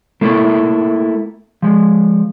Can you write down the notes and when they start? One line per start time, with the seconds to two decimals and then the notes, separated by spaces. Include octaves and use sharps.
0.21 A3 A#3 E4 F4 A4
1.62 F3 G#3